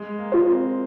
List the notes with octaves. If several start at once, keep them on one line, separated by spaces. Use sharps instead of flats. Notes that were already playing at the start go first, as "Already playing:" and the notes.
Already playing: G#3
A#3
F4 C5
C4